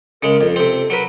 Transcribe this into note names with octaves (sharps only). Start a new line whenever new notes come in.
C#3 G#3 A#4
F2
C3 C4 A4
F#3 A#4 B4